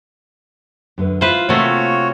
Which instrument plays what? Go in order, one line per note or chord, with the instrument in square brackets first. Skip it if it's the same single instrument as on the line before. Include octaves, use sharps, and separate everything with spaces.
[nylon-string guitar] F#2 D3 B4
[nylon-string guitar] E4 [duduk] F4 [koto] B4 C5
[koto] C3 A3 [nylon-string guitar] A#3 [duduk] F4 [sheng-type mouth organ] F#4 C#5